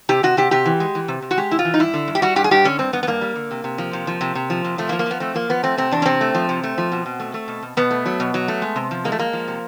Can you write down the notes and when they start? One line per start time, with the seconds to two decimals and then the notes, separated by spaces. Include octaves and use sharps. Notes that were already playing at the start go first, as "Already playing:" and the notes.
0.09 C3 G4
0.23 C3 F#4
0.37 C3 G4
0.51 C3 G4
0.65 E3
0.80 G#3
0.95 E3
1.08 C3
1.22 C3
1.31 F#4
1.38 G#3 G4
1.51 C3 E4
1.59 F4
1.65 E3
1.74 D#4
1.79 G2 E4
1.94 D3
2.08 G2
2.15 G4
2.22 G3 F#4
2.36 G2 G4
2.44 G#4
2.51 G2 G4
2.65 D3 C#4
2.79 G2 C4
2.93 G2 B3
3.03 B3
3.07 G2 A#3
3.21 G3
3.35 D3
3.51 C3
3.64 C3
3.78 F3
3.93 C3
4.07 F3
4.21 C3
4.35 C3
4.50 F3
4.65 C3
4.78 F3 A3
4.89 A#3
4.92 F3
4.99 A#3
5.06 F3 B3
5.20 A3 C4
5.34 F3 A#3
5.49 F3 B3
5.63 A3 C4
5.77 C3 C4
5.91 E2 D4
6.02 C#4
6.05 C3 C4
6.21 A3
6.35 F3
6.49 C3
6.64 A3
6.78 F3
6.92 B2
7.06 B2
7.20 A3
7.34 A3
7.48 B2
7.63 B2
7.77 B2 B3
7.91 A3
8.06 F#3
8.20 B2
8.34 F#3
8.48 A3
8.62 G#3
8.76 C3
8.91 F3
9.05 G#3 A#3
9.12 A3
9.19 G#3 A#3
9.33 F3
9.48 C3